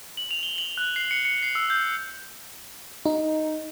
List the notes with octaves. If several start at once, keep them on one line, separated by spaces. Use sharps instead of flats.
F#7
F7
G7
F#7
F#6
C7
C#7
C#7
C7
E6
G6
D#4